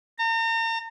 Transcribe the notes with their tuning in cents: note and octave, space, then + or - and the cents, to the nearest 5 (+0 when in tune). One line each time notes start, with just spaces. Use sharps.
A#5 -40